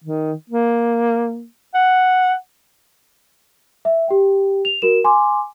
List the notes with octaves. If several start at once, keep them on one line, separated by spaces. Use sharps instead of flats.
D#3
A#3
F#5
E5
G4 G5
F7
F#4 A#4 E7
G#5 C6 D6